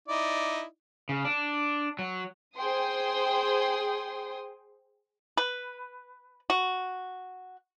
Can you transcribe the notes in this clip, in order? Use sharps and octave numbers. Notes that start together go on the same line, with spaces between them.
D#4 E4 D5
C#3
D4
F#3
G#4 C5 G5 C6 D#6
B4
F#4